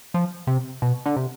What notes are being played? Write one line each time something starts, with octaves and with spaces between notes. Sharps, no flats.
F3
C3
B2
D3
C3